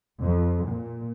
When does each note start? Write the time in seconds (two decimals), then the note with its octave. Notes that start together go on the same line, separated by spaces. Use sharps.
0.23 F2
0.69 A#2